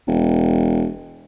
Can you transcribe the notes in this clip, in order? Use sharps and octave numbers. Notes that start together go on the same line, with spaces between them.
E1